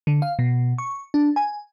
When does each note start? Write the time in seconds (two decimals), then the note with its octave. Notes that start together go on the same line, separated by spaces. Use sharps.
0.07 D3
0.22 F5
0.39 B2
0.78 C#6
1.14 D4
1.36 G#5